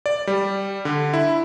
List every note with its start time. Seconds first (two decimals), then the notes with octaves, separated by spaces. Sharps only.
0.06 D5
0.27 G3
0.85 D3
1.13 E4